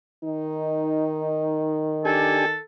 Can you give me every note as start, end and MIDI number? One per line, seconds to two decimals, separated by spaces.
0.24 2.57 51
0.24 2.15 63
2.05 2.46 62
2.05 2.46 67
2.05 2.61 69
2.05 2.46 80